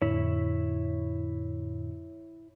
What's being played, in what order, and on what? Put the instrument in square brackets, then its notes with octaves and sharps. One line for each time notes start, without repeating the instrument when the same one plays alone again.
[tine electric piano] F2 A2 D3 [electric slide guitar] E4 C#5